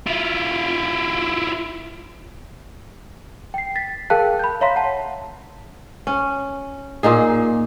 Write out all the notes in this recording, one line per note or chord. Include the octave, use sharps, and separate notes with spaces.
E4 F4
G5 C7
A6 B6
G#4 A#4 F5 G5 A5 F#6
B5 G6
C#5 E5 F5 A#5 C6 B6
F#5 A5
C#4
A#2 A#3 D#4 G#4